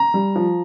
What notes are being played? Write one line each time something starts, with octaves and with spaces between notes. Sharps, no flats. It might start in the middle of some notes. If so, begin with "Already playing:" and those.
Already playing: A#5
G3
F3